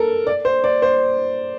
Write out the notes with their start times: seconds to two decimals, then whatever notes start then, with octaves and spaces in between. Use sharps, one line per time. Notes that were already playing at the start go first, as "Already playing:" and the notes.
Already playing: A4 A#4
0.27 D5
0.45 C5
0.64 D5
0.82 C5